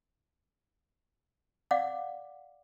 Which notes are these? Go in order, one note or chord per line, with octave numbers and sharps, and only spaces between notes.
D5 F5 F#5 D6